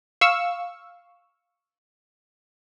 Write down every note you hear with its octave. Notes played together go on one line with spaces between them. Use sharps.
F5 C#6 E6